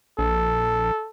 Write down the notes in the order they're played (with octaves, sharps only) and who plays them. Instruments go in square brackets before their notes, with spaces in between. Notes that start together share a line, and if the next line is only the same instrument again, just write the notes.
[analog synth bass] A#1 [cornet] A4